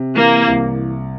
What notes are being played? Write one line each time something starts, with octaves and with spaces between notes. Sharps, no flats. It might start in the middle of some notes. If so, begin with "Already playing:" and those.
Already playing: C3
E3 A#3
C2